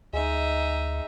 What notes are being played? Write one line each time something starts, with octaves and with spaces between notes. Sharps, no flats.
D2 G#3 D#4 E5